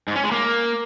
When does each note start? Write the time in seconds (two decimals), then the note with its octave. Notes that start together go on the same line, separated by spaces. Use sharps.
0.08 G#2
0.16 C#4
0.24 G#3
0.32 A#3